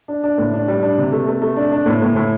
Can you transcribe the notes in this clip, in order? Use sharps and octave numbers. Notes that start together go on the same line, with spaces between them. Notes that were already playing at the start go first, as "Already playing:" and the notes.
D4
D4
A2
D4
G3
D4
C3
A3
A3
A3
D4
D4
A2
A2
A2